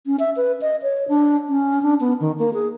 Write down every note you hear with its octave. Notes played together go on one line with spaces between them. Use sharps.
C#4
E5
B4
D#5
C#5
D4
C#4
D4
B3
D#3
A#3
G#4